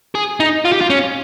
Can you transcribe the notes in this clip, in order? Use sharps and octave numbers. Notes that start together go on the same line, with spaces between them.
G#4
D#4
F4
G4
F4
C#4